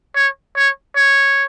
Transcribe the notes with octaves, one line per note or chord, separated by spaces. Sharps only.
C#5
C#5
C#5